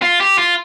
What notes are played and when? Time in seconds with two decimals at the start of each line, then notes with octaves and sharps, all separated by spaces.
0.02 F4
0.20 G4
0.38 F4